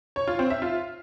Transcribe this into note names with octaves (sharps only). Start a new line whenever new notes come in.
C#5
F4
C4
E5
F4